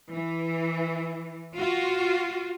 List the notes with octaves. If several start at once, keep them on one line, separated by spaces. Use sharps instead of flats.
E3
F4 F#4